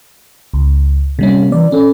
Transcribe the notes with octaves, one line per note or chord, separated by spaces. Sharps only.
C#2
C3 G3 A#3 C#4
E3 D5
C#4 A4